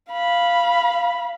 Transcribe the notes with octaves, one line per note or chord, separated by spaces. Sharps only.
F5 B5